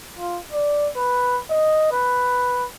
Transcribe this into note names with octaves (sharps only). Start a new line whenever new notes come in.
F4
D5
B4
D#5
B4